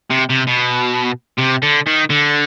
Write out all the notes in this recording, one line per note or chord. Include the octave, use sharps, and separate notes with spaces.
C3
C3
B2
C3
D3
D#3
D3